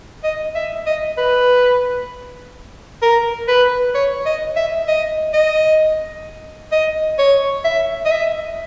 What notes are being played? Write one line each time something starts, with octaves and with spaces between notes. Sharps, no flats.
D#5
E5
D#5
B4
A#4
B4
C#5
D#5
E5
D#5
D#5
D#5
C#5
E5
D#5
E5